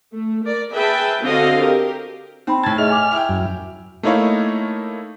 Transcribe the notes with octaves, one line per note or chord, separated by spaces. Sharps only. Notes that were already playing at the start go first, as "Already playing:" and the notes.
A3
A#4 D5
G#4 B4 E5 G5 A5
D3 C4 F#4 D#5 F5
G4 A#4
C4 D#4 G5 B5
A2 A5 G#6
G#4 D#5 E5 F6
G#5 D6
E4 G5
F#2
A3 A#3 D#4 E4 C#5 F5